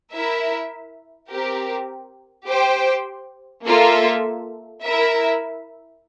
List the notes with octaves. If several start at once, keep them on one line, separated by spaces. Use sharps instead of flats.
E4 A#4 E5
C4 G4 A#4
G4 C5 G5
A#3 F4 A4 E5
E4 A#4 E5